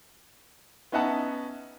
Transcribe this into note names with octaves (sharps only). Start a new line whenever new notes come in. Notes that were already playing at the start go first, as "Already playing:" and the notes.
B3 C#4 D#4 E5 F#5 A5